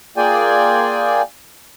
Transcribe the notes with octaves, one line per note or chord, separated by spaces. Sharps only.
A#3 F4 G#4 D5 G5 G#5